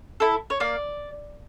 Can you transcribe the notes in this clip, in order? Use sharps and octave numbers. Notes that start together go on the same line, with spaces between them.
E4 A4
C#5
A#3 D5